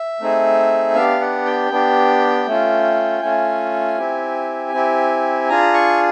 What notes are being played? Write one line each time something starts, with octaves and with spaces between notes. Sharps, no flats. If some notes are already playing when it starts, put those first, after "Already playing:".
Already playing: E5
A3 C4 D#4 G#4
B3 D4 G4 F5
F#5
G5
B3 D4 G4
A3 C#4 F4
A3 C#4 F4 G#5
C4 E4 G4
C4 E4 G4
D4 F4 G#4 A#5
C#6